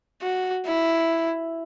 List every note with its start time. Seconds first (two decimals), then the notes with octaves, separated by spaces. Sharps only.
0.22 F#4
0.67 E4